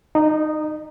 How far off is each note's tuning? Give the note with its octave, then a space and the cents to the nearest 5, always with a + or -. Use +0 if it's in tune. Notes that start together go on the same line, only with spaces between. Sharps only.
D#4 -10 D#5 -45